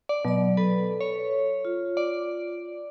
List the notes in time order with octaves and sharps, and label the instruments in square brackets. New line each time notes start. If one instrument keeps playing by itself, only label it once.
[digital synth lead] D5
[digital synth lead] B2 [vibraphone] F#3 D5
[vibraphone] A4 [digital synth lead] B4
[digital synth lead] C#5
[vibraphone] F4
[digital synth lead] D5